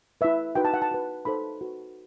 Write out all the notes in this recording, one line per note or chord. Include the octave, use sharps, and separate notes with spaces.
E4 B4 E5
D#4 F#4 B4 G5
A5
F#5
A5
F#4 B4
D#4 A4 C5 B5
F#4 B4